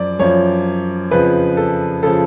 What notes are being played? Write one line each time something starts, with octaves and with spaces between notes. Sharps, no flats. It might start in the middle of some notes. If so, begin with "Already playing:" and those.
Already playing: F#2 F3 D5
F#2 F3 C#5
F2 C#3 F3 B4
A4
C#3 F3 A4